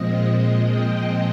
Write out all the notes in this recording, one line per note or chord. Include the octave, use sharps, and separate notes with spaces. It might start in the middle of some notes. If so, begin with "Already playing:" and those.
Already playing: A#2 F3 G#3 C4 D#5
G5